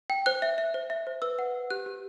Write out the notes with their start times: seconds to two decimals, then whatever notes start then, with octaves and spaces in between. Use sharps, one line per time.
0.10 G5
0.26 C5 F#6
0.42 E5
0.58 E5
0.74 C5
0.90 E5
1.07 C5
1.22 B4 E6
1.39 F#5
1.54 B4
1.70 G4 F#6
1.86 G4